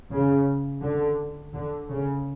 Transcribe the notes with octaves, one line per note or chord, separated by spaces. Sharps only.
C#3
D3
D3
C#3